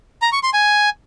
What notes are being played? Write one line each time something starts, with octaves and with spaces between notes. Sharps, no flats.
A#5
C#6
C6
G#5